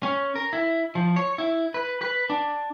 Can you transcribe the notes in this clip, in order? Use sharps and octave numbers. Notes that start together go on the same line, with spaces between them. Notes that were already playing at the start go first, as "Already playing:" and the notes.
C#4
A#4
E4
F3
C#5
E4
B4
B4
D4